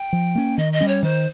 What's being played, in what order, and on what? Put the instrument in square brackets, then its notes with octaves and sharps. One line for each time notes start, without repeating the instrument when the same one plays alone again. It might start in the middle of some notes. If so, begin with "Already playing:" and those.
Already playing: [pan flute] G5
[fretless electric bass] F3
A#3 C#4
[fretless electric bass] D#3 [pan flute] D#5
[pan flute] D#5
[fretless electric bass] G3 C#4
[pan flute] C#5
[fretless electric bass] D#3 [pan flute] C5